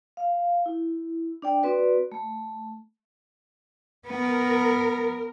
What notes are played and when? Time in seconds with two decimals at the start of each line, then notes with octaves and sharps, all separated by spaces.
0.17 F5
0.66 E4
1.42 D4 D5 G5
1.63 C4 F#4 B4 D5
2.12 A3
4.07 B3 A#4